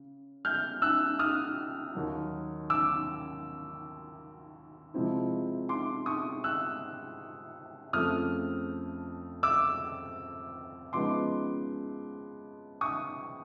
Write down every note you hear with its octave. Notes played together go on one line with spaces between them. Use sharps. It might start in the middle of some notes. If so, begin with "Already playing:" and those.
Already playing: C#3
F6 G6
E6 F#6
D#6 F6
D#2 D#3 F#3
D6 E6
C3 F3 G#3 C4 E4
C6 D6
C#6 D#6
E6 F#6
F2 C#3 F3 A3 D#6 F6
D6 E6
C#3 F3 G#3 B3 D#4 C6 D6
C#6 D#6